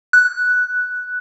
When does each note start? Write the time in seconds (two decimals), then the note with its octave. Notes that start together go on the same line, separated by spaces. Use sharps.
0.13 F#6